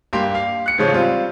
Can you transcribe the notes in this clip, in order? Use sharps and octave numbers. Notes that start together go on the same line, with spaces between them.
G2 A#3 G4 C6
F5
F#6 C#7
G#2 C#3 F3 G#3 C#4
G3 C4 F4